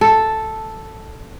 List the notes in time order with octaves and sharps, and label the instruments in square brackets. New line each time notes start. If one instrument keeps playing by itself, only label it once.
[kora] A4